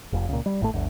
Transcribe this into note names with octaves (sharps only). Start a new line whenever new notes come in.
F1 F2
C#2 A#2
G3
G#1 A2 D#3 A3
G1 D2